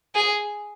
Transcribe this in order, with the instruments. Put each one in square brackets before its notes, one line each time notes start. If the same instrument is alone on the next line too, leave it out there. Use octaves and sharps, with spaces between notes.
[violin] G#4